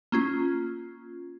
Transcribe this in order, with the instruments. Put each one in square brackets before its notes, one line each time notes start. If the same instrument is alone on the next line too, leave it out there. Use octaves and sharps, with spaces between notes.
[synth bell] A#3 C#4 F4